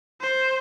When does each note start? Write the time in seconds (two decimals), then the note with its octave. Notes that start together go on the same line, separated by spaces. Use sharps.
0.21 C5